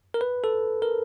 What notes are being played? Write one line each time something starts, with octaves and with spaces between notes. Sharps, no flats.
A#4
B4
A4
A#4